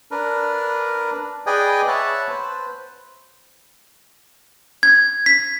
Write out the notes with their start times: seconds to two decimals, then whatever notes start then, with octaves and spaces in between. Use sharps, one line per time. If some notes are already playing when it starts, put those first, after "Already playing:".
0.11 D4 A#4 B4
1.46 G#4 B4 D5 D#5 G5 G#5
1.88 C#5 E5 F#5 A5 B5
2.29 B4 C5
4.83 G#6
5.26 B6